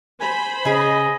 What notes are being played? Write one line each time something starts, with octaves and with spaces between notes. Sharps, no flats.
C5 G#5 B5
C#3 G#4 D#5 G#5